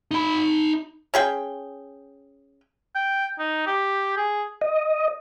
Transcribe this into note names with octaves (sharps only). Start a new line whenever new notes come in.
D#4 B5
C#4 G#4 G5
G5
D#4
G4
G#4
D#5